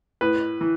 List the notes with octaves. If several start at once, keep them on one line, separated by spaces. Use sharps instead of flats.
A2 B4
E3